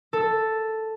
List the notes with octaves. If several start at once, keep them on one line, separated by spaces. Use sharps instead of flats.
A4